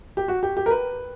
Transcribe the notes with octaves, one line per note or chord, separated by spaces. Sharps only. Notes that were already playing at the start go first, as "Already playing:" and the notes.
G4
F#4
G4
G4
A#4
B4